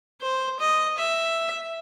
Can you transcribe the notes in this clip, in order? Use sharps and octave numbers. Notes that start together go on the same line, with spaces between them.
C5
D#5
E5